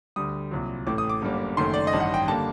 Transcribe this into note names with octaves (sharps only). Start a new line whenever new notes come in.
D2 D3 G3 D#6
C2 A#2 F#3
A1 A2 A3 D6
D#6
D6
G1 F#2 D3 G3 A#3
F#1 F#2 D#3 A3 C6
D5
D#5
A1 G2 D#3
F#5
G5
D3 G3 A#3 A5